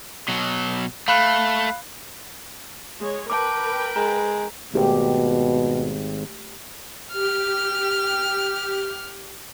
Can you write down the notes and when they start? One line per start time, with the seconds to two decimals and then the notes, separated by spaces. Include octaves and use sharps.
0.28 B2 F#3
1.08 A3 F5 B5 F#6
3.00 G#3 C#5
3.30 A#4 B4 G5 A5 D6
3.96 G#3 A#5
4.73 G#1 B2 A3 G4
7.12 G4 F6